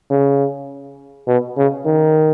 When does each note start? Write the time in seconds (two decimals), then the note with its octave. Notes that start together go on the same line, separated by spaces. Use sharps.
0.11 C#3
1.27 B2
1.57 C#3
1.86 D#3